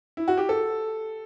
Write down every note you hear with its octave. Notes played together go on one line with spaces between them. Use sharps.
E4
F#4
G4
A4